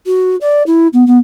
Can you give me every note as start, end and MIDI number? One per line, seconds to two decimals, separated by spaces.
0.06 0.36 66
0.41 0.62 74
0.67 0.87 64
0.93 1.03 59
1.07 1.18 59